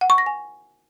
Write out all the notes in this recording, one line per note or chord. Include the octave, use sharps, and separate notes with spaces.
F#5
C#6
A#6
G#5